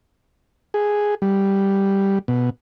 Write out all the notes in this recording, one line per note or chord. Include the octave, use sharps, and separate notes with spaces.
G#4
G3
B2